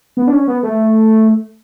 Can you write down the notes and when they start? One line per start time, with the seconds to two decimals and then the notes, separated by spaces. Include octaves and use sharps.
0.17 B3
0.27 D4
0.33 C#4
0.47 B3
0.63 A3